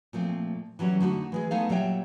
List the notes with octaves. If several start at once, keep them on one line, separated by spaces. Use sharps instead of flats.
A#2 F3 A3 C4
E3 F#3 G3 C#4
D3 A3 D#4 F#4
E3 G#3 G#4
G#3 A3 B3 D#4 A4 F5
A#2 F#3 G3 C#5 E5 G5